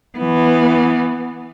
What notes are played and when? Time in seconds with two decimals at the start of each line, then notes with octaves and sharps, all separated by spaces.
0.18 E3 B3